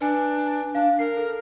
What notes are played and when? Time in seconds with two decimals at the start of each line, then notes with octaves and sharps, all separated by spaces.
0.01 D4 B4 G#5
0.75 D4 F5
0.99 A#4 C7
1.17 A4